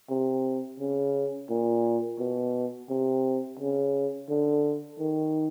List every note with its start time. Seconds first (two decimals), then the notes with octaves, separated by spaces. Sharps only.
0.10 C3
0.80 C#3
1.49 A#2
2.19 B2
2.89 C3
3.59 C#3
4.29 D3
4.99 D#3